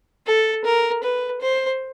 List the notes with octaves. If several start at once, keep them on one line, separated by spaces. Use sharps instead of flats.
A4
A#4
B4
C5